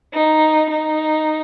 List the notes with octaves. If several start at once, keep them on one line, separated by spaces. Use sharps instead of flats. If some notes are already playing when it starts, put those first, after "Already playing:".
D#4
D#4